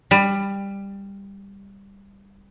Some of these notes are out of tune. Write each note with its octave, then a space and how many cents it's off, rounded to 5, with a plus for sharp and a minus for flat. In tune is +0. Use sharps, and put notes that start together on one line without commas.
G3 +15